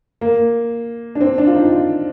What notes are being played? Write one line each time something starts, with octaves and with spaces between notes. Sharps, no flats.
A#3
D4
C4
D4
F4
D#4
F4